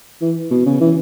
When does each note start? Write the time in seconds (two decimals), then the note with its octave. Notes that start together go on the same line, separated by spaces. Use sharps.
0.21 E3
0.51 B2
0.66 C#3
0.81 E3